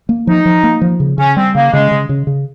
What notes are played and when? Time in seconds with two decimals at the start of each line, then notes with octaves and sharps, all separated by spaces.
0.09 A#3
0.27 F3 D#4
0.45 F3
0.64 A#3
0.82 F3
1.00 C#3
1.18 C#3 C#4
1.37 G3 C4
1.55 C#3 A#3
1.73 C#3 G#3
1.91 C#3
2.09 C#3
2.27 C#3